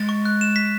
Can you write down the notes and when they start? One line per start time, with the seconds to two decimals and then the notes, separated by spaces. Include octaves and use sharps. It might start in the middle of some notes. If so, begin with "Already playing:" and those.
Already playing: G#3 A6
0.09 C#6
0.25 F#6
0.41 E7
0.56 B6